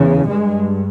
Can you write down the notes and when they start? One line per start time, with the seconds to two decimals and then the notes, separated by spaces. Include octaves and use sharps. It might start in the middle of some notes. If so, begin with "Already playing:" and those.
Already playing: E2 C#3
0.29 G2 G#3